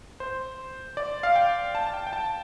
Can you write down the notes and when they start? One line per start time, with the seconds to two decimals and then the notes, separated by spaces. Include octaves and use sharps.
0.20 C5
0.97 D5
1.23 F5
1.36 G5
1.75 A5
1.87 A5
1.94 G5
2.07 G5
2.13 A5